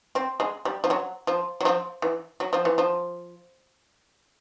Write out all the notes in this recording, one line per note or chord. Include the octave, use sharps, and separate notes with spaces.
C4
G#3
G3
F3
F#3
F3
F#3
F3
E3
F#3
F3
E3
F3